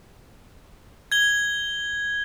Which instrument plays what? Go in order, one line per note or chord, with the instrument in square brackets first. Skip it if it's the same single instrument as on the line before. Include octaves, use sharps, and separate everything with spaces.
[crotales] G#6 G7